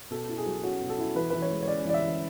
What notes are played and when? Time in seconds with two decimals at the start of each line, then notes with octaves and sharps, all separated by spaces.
0.11 B2 A4
0.29 E4
0.38 G#4
0.46 F#3
0.63 C#4 F#4
0.81 B2
0.90 A4
0.99 E4
1.15 E3 B4
1.30 E3 B4
1.42 C#5
1.51 G#3
1.63 C#5
1.68 C#4 D5
1.85 E3 D5
1.94 E5
2.02 E3